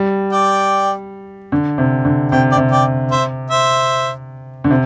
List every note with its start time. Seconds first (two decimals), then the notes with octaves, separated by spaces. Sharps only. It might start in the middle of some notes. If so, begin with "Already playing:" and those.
Already playing: G3
0.32 D5 G5
1.52 D3
1.78 C3
2.05 D3
2.32 C3 G5
2.52 D5 G5
2.57 C3
2.72 D5 G5
3.11 C5 E5
3.50 C5 E5
4.64 D3
4.71 C3